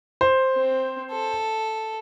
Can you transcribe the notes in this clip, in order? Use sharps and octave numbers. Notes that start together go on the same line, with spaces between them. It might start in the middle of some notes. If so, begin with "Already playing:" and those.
C5
C4
A4